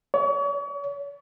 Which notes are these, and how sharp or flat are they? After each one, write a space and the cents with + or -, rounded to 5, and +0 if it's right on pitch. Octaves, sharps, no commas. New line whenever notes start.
C#5 +40